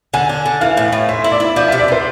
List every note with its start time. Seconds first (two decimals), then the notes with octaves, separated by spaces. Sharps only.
0.14 D3 G#5
0.29 D4
0.46 D3
0.61 E3 F5
0.77 A2
0.92 A2
1.09 C4 E5
1.24 E4
1.32 D5
1.40 E4
1.56 F3 D5
1.68 C3 E5
1.80 D5
1.88 B3 C5